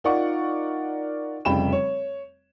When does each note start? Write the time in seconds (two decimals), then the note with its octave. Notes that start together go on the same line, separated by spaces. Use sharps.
0.04 D#4 F4 A#4 D5 F#5 C#6
1.45 F1 C#3 G3 G5 B5 E7
1.72 C#5